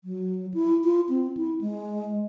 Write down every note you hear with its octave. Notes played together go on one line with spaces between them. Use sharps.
F#3
E4
F4
C4
E4
G#3